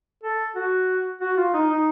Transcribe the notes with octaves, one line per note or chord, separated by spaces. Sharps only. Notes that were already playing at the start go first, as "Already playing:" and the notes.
A4
F#4
F#4
F4
D#4
D#4